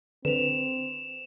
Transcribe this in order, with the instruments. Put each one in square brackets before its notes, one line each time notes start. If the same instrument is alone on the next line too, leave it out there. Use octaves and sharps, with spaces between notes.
[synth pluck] D3 [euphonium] C4 [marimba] B4 [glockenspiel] E7 F7